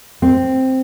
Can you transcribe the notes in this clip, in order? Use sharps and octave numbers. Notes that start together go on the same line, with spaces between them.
C4